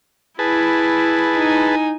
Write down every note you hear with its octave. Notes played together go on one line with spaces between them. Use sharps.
E4 G#4 B4 A5
D#4 G#5